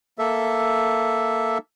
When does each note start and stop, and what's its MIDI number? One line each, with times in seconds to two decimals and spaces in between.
0.19 1.58 58
0.19 1.58 69
0.19 1.58 76